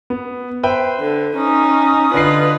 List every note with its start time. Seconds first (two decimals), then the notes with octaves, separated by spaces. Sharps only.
0.10 B3
0.63 B4 C5 E5 G5
1.00 D3
1.37 C#4 D#4 D#6
2.14 D3 F4 B4 D#5 C7